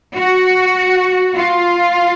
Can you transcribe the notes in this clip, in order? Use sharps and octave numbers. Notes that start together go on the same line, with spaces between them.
F#4
F4